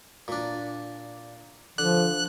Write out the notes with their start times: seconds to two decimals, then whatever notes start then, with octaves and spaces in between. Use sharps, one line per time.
0.28 A#2 D4
1.78 D3 F3 F#6